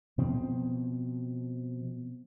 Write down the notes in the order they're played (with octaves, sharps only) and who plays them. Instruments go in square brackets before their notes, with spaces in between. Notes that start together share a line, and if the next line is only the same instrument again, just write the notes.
[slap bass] B2 F3 C4